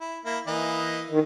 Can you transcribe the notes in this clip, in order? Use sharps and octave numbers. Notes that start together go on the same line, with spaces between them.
E4
A#3 E4
E3 A#3 D#5
D#3